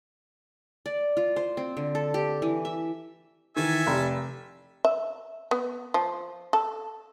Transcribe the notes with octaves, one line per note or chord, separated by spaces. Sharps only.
D5
F4
C5
C4
D3
A4
G4
E3
E5
D#3 E3 A4 E5 G#5
F1 G4
E5
B3
F3
A4